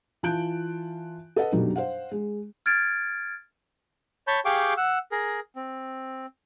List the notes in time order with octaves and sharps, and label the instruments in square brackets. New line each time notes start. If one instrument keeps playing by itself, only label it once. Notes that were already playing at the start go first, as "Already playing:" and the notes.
[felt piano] E3 F4 A5 F#6 G6 D7
A4 B4 D#5 F#5
F#2 B2 F#3 G3 D4 D#4
C5 F5 F#5
G#3
[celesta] F6 G#6 A6 D7
[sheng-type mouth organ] C#5 A5 B5 G6
G4 G#4 F5 G5 C#6 D6
F#5 E6
G#4 A#4
C4